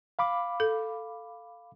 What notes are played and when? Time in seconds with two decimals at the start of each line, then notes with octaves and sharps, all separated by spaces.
0.19 F5 B5 D6
0.60 A4